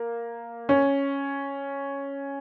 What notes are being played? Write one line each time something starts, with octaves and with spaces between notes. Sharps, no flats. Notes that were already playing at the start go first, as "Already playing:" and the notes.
Already playing: A#3
C#4